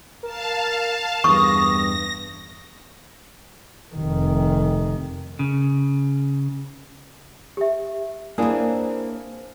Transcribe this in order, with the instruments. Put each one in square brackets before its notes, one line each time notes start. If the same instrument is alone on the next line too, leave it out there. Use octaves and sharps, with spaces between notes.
[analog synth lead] A#4 [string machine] F5 A5
[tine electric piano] E2 G2 [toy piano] C#6 [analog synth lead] D#6 [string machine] A#6
[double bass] F1 D#3
[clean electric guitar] C#3
[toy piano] G4 E5
[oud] E3 C4 [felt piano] A#3 [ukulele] D4 E4 G#4